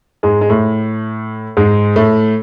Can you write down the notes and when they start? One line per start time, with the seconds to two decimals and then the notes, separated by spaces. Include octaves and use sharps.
0.23 G#2 G#3
0.41 G#3
0.49 A2 A3
1.57 G#2 G#3
1.96 A2 A3